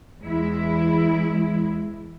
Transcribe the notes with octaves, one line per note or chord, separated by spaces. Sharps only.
E2 G#3 E4